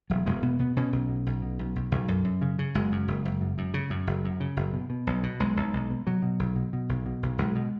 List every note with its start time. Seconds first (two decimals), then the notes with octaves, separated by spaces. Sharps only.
0.10 E1 F#3
0.26 E1 G#3
0.42 B2 B3
0.59 B2 B3
0.77 B2 C#4
0.92 B1
1.09 B2
1.26 B1
1.42 B2
1.59 B1
1.76 B1
1.91 B1
2.08 F#2
2.25 F#2
2.41 C#3
2.59 C#3
2.75 F#1 G#3
2.92 F#2
3.08 F#1
3.25 F#1
3.41 F#2
3.58 F#2
3.74 C#3
3.90 F#2
4.07 F#1
4.25 F#2
4.40 C#3
4.57 F#1
4.73 B2
4.90 B2
5.07 B1
5.23 B2
5.40 B1 G#3
5.57 B1
5.73 B1
5.90 B2
6.07 B2 F#3
6.22 B2
6.39 B1
6.56 B2
6.73 B2
6.89 B1
7.06 B2
7.23 B1
7.38 B1 G#3
7.55 B2